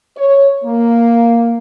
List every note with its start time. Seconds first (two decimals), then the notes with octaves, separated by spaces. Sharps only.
0.17 C#5
0.64 A#3